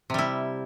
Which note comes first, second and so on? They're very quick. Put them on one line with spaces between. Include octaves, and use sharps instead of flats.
C3 G3 E4